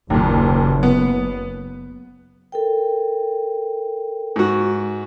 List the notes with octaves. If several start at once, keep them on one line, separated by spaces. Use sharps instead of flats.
F#1 D#2 A#2
B3
A4 A#4 G5
G#2 F#4